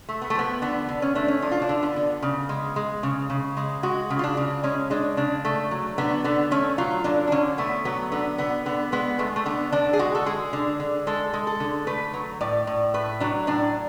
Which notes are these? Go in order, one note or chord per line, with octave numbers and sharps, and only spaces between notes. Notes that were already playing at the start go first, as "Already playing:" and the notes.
A3
B3
A3
F3 B3
D3 B3
D3
C#4
A3 D4
C#4
F3 D4
F4
D4
D3
B3
D3
C#3
G#3
G#3
C#3
C#3
G#3
G#3 F#4
C#3
F4
D4
C#3
G#3 C#4
G#3 D4
C#3 D4
A3
F#3
D3 B3
D3 B3
A3 C#4
F#3 F4
D3 D4
D4
D3 C#4
A3 B3
F#3 B3
D3 B3
D3 B3
D3 B3
G#3 B3
G#3 A3
A3
D3 B3
D3 D4
G#4
G#3 F#4
A4
G#3 G#4
D3
D3
G#3 A4
G#3
A4
D3
A3 B4
F#3
A2 D5
A2
A3 B4
F#3 D4
A2 D4